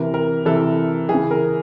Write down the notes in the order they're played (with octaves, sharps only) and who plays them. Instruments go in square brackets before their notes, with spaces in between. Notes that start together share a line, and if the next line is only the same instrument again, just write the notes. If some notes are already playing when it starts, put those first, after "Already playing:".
Already playing: [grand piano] C3 E3 A#4
A#4
C3 E3 A4
E3 G#4
C#3
A#4